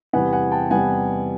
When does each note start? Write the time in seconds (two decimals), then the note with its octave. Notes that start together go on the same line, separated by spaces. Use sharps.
0.13 E2 C3 E3 G3 B3 F#5 G#5
0.33 F#5 G#5
0.51 G5 A5
0.71 E2 C3 E3 G3 B3 F#5 G#5